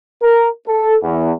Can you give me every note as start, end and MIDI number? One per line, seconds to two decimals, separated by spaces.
0.22 0.50 70
0.67 0.96 69
1.03 1.31 40